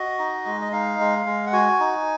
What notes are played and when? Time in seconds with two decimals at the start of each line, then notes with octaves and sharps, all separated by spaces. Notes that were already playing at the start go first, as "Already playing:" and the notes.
Already playing: F#4 D#5
0.19 D#4
0.46 G#3
0.61 D#5
0.72 D#4 F5
0.99 G#3
1.26 G#3
1.46 F#5
1.53 F#4 G#5
1.80 D#4